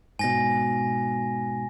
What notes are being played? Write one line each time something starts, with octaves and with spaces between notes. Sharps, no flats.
G#2 B2 G#5 A#6